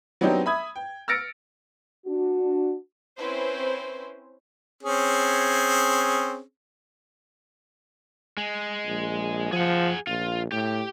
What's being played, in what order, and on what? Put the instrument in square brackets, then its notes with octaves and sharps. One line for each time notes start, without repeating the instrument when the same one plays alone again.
[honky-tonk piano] F#3 B3 C4 D4 D#4 G4
E5 B5 D#6 G#6
G5
E6 F6 A6 A#6 C#7 D7
[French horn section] D4 F#4
[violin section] C4 C#4 E4 B4 C5
[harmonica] C4 C#4 G#4
[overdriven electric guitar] G#3
[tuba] A#1
[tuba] F3 [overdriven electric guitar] G#4 F#5
[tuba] A#1 [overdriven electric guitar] F4
[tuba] A2 [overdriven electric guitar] G4